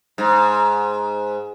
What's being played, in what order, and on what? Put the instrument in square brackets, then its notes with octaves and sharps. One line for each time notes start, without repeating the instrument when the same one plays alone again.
[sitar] G#2